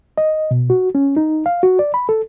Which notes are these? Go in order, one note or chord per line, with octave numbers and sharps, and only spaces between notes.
D#5
B2
F#4
C#4
D#4
F5
F#4
D5
B5
A4